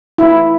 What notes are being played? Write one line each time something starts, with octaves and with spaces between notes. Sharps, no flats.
E4